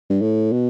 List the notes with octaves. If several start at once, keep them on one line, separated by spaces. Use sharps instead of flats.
G2
A2
B2